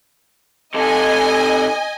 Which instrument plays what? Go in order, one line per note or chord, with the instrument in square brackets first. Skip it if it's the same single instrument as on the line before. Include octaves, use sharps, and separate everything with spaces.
[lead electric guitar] C3 A4 [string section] D#5 G#5